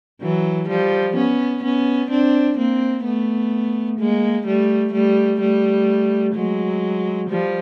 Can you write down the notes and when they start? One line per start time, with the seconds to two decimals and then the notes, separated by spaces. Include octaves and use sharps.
0.21 E3 F#3
0.69 F3 G3
1.16 B3 C#4
1.63 B3 C#4
2.10 C4 D4
2.58 A#3 C4
3.04 A3 B3
3.99 G#3 A#3
4.46 G3 A3
4.93 G3 A3
5.40 G3 A3
6.35 F#3 G#3
7.29 F3 G3